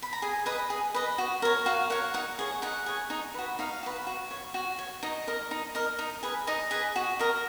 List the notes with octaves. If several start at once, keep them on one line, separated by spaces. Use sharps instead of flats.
B5
A#5
G#4 G#5
B4 D#5 D#6
G#4
B4 D#5
F#4
A#4 C#5
F#4 F5
A#4 C#5 F#5
D#4 F#5
G#4 C#5
D#4 F#5
G#4 C#5
D#4
F#4 B4
D#4 F5
F#4 B4
F#4
C#5
F#4
C#5
D#4 D#5
A#4 D#5
D#4
A#4 D#5
D#4
G#4 B4
D#4 D#5
G#4 B4
F#4
A#4 D#5